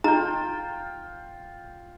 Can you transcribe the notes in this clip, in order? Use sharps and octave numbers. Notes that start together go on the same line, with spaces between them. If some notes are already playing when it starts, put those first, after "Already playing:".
D#4 F4 G5 A#5